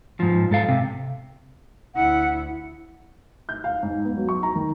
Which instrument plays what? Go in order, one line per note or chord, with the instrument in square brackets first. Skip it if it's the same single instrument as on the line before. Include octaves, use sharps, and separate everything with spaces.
[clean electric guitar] G#2 F3
G#2 A4 F5
C3
[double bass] D2 E4 [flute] F#5
[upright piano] G6
F5
G#2
B3
F#3
C#6
A#5
D#3